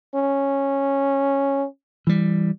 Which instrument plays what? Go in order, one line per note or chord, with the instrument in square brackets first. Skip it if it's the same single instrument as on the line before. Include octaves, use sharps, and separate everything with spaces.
[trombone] C#4
[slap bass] E3 G3